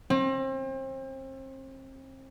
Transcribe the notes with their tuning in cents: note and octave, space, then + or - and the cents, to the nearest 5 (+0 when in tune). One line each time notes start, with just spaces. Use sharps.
C4 +35